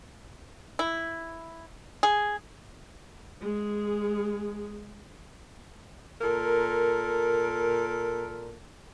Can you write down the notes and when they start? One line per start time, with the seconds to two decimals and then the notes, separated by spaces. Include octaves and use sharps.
0.79 E4
2.03 G#4
3.41 G#3 G#4
6.21 A#2 A4 A#4